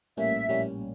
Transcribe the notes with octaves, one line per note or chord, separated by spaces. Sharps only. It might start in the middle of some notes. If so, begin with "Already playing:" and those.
A#1 A2 G3 A#3 C#4 E5
A#1 A2 G3 A#3 C#4